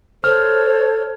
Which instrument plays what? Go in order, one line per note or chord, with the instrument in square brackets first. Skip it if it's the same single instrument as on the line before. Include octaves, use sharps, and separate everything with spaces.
[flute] A4 [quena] C5 [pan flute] C#5 [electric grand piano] F6